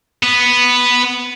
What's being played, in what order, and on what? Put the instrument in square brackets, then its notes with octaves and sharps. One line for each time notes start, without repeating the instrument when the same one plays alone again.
[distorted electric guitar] B3